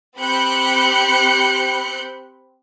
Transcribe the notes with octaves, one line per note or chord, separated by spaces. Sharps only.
C4 G4 B5 F#6 G6 C#7